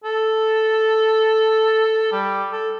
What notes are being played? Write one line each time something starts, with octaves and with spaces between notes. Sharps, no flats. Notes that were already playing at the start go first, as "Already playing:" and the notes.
A4
G3
A4